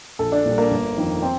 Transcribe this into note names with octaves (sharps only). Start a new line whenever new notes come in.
A#1 A4
D4
A#2 G3
A#3
G1
F2 D#3
C4